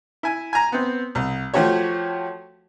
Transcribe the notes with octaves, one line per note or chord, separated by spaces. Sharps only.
E4 G#5
G#5 A#5
B3 C4
C2
F3 A3 F#4 G4 C#5